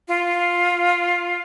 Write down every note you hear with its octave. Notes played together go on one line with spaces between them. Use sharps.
F4